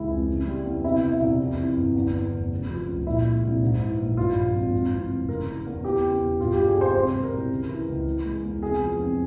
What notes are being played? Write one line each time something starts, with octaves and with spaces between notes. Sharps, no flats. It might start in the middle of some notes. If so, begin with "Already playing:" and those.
Already playing: C#2 E3 G#3 E4
F2
C#3
G3
E2
C3 E4
E3
E4
C2
F2
E3
G1
E2
E3
F1
C#3
F3
C#2
A#2 E4
G#3
C2
G#2
E3
A#1
G2 F4
F3
G#1
F2
E3
F1
C#3 A#4
E3
E2
E2 G4
C#3
E1
G2 F4
G4
G3
G#4
G#1 C5
C3 C5
G3
A#4
C2
C#3
E3
C#2
E3
G#3
E2
C3 G#4
F3
F2